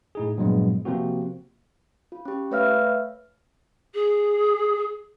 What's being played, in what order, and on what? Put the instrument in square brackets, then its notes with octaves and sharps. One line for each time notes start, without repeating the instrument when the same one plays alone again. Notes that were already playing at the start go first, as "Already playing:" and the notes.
[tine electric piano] A2 D#4 G#4
G2 A#2 F3 F#3 G#3 B3
C3 F3 A#3 C4 F#4
[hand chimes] F4
C#4 G4
A3 B4 C#5 E5 F5 F6
[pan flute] G#4